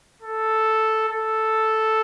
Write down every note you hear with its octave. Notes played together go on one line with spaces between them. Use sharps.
A4
A4